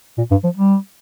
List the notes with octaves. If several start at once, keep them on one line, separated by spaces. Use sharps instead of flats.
A#2
G2
F3
G3